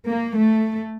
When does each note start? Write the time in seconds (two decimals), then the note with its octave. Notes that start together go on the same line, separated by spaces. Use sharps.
0.09 A#3
0.39 A3